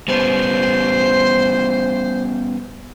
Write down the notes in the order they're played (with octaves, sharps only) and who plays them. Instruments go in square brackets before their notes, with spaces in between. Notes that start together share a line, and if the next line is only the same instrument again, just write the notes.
[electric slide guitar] G3 B3 C#4 [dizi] C5